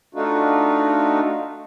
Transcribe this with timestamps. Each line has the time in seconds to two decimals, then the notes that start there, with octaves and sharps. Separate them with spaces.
0.15 A3 D4 D#4 F4 F#4